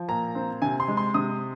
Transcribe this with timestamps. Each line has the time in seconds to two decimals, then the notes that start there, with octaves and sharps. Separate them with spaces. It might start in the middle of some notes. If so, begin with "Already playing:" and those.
Already playing: F3
0.08 A#2 A#5
0.35 C4
0.62 C3 G#5
0.80 C6
0.88 G#3
0.97 C6
1.14 C3 D#6